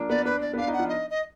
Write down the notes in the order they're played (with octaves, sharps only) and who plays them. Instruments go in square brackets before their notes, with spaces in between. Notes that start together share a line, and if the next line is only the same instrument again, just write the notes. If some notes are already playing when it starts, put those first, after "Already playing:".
Already playing: [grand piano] F3 A#3 D4
[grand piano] B3 [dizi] D5
[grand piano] D4 [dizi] B4
[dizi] D5
[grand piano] B3
[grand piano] D4 [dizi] F5
[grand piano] D#4
[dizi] F#5
[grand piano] F3
[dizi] D#5
D#5